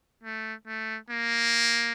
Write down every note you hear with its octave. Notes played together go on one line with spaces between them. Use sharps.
A3
A3
A#3